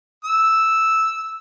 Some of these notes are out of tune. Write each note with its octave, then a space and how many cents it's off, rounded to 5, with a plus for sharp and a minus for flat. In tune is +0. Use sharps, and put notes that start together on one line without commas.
E6 -5